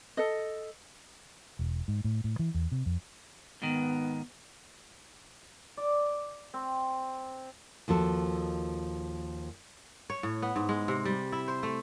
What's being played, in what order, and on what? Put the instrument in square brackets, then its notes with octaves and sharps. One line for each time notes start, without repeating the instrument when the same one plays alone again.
[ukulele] A4 D#5
[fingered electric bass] E1
G#2
A2
A2
E3
E2
C3
F2
[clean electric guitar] G#2 D#3 [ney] B3
[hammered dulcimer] D5
C4
[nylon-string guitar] D#2 F3 F#4 A4
[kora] C#5
A2
B3
G#2
G#3
C3
G3
E4
C5
A3